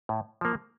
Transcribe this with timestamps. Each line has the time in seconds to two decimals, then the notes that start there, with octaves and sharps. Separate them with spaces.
0.09 A2
0.41 F3 A#3